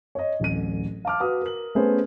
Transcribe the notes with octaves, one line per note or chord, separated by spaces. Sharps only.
C#5 D#5
D1 A1 D#7
F5 A5 D6 F6
F#4 B4 F5 D#6
A#4 F#7
A3 B3 C#4 G#4 B4 C5